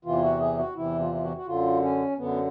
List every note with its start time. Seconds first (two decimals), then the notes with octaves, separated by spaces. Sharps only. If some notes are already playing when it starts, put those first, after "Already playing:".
0.05 E2 C3 E3 F4
0.23 F#4
0.41 G#4
0.58 F#4
0.76 E2 C3 E3 E4
1.00 F4
1.15 F4
1.23 F#4
1.37 F#4
1.47 F#2 D3 F4
1.82 C#4
2.17 F#2 D3 B3